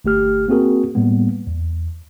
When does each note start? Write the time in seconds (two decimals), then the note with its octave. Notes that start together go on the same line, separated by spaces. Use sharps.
0.05 G1 A3 G4 F6
0.48 A#3 C4 F#4 G#4 A#4
0.95 A2 G3 A#3 B3
1.47 E2